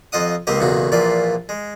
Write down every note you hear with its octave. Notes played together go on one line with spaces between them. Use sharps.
F2 F4 D#5 F#5 D#6
C#2 A#3 C4 G4 D#5
B1 E2 A#2 C#3 F#4
A#1 A#2 E3 F4 D5 C6
G#3